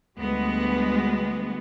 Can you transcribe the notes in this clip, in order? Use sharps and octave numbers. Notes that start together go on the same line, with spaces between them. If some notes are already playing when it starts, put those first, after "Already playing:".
D2 G3 G#3 B3